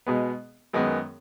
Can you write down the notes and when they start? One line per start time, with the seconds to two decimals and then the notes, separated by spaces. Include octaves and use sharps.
0.07 B2 G#3 B3
0.73 F#2 D#3 G#3 B3